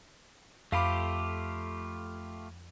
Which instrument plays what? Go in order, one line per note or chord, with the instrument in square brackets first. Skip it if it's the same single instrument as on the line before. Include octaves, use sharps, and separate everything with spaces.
[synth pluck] F2 [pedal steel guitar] A3 F4 G4 [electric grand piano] F5 B5 D6